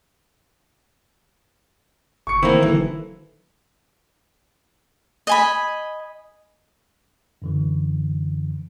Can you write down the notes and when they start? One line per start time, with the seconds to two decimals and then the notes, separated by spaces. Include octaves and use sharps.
2.27 F#1 C#6 C#7
2.43 D#3 E3 A#3 C4 E4
2.63 E1 D3 E3 F#3 A4
5.27 D#5 G#5 B5
7.42 F#2 D3 E3